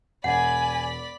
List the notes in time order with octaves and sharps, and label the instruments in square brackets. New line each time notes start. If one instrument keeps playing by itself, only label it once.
[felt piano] E1 [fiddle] D5 B5 [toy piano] F#5 [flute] G#5